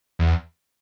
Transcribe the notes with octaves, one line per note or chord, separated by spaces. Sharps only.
E2